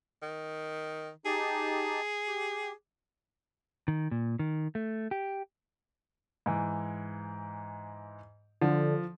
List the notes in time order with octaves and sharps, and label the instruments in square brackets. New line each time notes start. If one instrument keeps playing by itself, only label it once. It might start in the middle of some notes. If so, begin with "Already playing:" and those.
[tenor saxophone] D#3
[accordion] D#4 G4 A5 [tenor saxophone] G#4
[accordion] G4
[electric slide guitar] D#3
A#2
D#3
A3
G4
[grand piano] G#2 E3
[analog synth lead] D3 [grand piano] F3